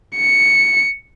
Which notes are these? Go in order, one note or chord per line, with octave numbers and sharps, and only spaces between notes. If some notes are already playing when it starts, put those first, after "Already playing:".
C#7